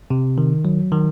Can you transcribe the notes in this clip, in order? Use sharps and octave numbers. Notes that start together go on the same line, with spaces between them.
C3
D#3
F#3
D#3